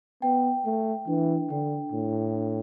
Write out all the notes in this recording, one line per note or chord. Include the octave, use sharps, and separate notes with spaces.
B3 G5
A3 G5
E3 D4
D3 G5
A2 D4
D4